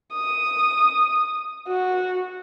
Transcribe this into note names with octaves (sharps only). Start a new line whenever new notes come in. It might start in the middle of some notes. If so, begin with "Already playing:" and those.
D#6
F#4